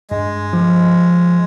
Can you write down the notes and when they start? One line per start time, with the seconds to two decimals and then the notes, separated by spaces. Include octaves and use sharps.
0.10 G2 G#3
0.53 F3